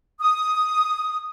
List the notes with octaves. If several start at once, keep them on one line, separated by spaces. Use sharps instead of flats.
D#6